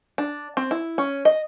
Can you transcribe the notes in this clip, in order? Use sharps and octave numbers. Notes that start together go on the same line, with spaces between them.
D4
C4
E4
C#4
D#5